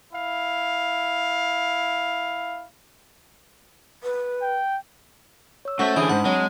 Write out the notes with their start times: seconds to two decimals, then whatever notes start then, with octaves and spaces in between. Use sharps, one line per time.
0.12 E4 F5
4.03 B4
4.42 G5
5.65 C#5 E6
5.79 A3 C#4 F#4 C5 E5 G6
5.96 D3 E3 D4 G#4 B5
6.09 G#2 F#5 A5 D#6
6.25 F#3 G#3 C4